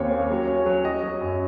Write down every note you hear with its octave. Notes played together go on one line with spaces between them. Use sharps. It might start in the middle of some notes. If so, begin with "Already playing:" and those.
Already playing: D#2 C4 C#4 C#5
A#3
F#3
C#4
F#3
F#3 D#5
F#3
F#2